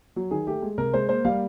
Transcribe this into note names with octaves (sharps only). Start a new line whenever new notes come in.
F#3
D#3 G#4
A3 G4
G#3
C3 A#4
G#3 C5
A#3 C5
G3 F5